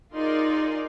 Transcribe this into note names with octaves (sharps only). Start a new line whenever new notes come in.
D#4 F4 G#4 A#4 D5 C6